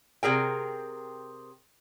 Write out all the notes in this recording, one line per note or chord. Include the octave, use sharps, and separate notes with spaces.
C3 G#4 A#4 G5